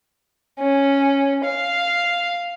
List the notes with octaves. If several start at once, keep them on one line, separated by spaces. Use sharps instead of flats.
C#4
F5